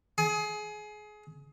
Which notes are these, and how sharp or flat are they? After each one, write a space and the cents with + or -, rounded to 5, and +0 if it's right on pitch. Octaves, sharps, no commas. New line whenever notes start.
G#4 +25